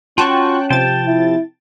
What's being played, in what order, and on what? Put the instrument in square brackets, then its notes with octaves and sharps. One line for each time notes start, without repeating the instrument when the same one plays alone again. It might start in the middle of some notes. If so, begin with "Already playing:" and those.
[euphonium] C#4 [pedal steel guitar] F4 F#4 C#6 [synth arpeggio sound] G5 A5 F#6
[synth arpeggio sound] C3 F3 A6 [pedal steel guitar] G5 A5
[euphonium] E4